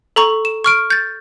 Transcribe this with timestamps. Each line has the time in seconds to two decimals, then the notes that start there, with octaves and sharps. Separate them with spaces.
0.16 A4 A#5 C#6
0.45 E7
0.64 C#6 F6 D7
0.90 G6 A6